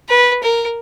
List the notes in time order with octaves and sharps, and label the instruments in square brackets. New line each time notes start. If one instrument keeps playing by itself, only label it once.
[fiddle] B4
A#4